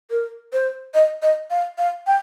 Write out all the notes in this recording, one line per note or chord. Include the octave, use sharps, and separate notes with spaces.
A#4
C5
D#5
D#5
F5
F5
G5